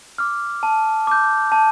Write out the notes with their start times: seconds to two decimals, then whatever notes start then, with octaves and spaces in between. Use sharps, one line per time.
0.18 D6 F6
0.63 A5
1.07 D6 G6
1.52 A5